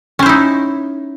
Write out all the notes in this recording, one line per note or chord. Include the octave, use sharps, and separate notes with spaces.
C#4 D#4 E4 C5